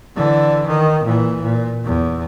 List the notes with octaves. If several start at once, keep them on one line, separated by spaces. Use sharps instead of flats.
D3 E3
D#3
A#2 E3
A#2
E2